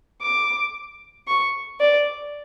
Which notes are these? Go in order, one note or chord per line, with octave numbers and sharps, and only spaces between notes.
D6
C#6
D5